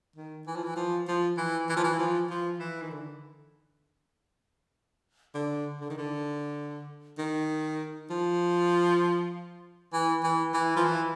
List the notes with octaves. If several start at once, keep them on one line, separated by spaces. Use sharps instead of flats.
D#3
E3
F3
E3
F3
F3
E3
E3
F3
E3
F3
F3
E3
D#3
D3
D3
D3
D#3
D3
D#3
F3
E3
E3
E3
F3
E3